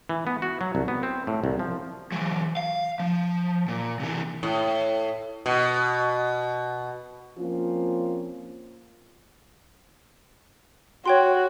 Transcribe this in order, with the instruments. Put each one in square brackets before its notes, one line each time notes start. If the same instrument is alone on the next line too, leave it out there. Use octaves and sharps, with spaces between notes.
[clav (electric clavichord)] E3
B3
F#4
F#3
C2
B3
C4
A2
C2
F3
[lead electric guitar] E3 F#3
F5
F3
A#2
C3 E3
[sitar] A2
B2
[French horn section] F3 A#3 C4 C#4 F4
[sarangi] F#4 [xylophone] C#5 G5 C6